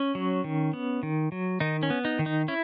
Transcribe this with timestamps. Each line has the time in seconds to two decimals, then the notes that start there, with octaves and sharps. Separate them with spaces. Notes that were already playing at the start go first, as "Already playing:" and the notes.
Already playing: C#4
0.15 F#3
0.44 D#3
0.73 B3
1.03 D#3
1.32 F#3
1.60 D#3 D#4
1.83 C#4
1.90 B3
2.05 D#4
2.19 D#3
2.26 D#4
2.48 C#4 E4